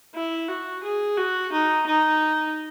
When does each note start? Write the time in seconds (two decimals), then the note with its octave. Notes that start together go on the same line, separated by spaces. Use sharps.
0.14 E4
0.48 F#4
0.83 G#4
1.17 F#4
1.52 D#4
1.87 D#4